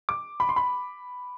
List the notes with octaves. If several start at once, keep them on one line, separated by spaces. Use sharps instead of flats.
D6
B5
C6
B5